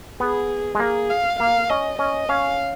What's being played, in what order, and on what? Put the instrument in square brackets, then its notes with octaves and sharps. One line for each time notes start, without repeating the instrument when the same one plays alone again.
[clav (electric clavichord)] B3 [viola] G#4
[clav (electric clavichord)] G#3
[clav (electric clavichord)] A#3 [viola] G#4
[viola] F5
[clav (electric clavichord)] A#3 [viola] F5
[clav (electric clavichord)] C#4 [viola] D#5
[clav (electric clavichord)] C#4 [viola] D#5
[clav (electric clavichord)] C#4 [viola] F5